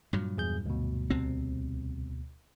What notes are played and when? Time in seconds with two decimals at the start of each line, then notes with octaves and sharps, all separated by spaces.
0.13 G2 A#2 F#3
0.38 E2 G#4 G6
0.66 D2 B2
1.10 C2 C3 C4